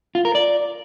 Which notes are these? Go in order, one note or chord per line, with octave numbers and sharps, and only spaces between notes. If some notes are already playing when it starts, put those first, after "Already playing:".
F4
A#4
D5